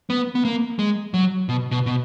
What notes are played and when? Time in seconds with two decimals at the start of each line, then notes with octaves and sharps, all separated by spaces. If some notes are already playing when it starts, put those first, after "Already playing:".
0.10 B3
0.35 B3
0.45 A#3
0.79 G#3
1.14 F#3
1.49 B2
1.71 B2
1.86 B2